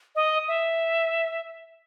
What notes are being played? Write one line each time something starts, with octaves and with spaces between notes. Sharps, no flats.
D#5
E5